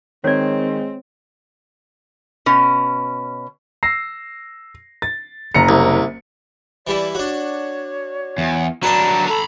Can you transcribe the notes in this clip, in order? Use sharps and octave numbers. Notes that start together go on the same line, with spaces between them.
D#3 G#3 C4 C#5 D5
B2 C#4
E6 A#6 C7
A6
F#1 A#5 C#7
C2
E3 G3 E4 D5
D4 F#4 C#5
E2
F#3 D4 B4 A5 A#5
A4 A#5 B5